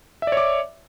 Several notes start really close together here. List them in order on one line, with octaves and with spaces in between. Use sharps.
E5 D5 C#5 D6